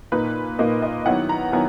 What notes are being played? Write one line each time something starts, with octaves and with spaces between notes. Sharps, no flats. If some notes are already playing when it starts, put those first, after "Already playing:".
A#2 A#3 D#4 B4
A#2 A#3 D#4 D#5
D#5
D#3 F#3 B3 E4 F#5
A#5
D#3 F#3 B3 E4 G#5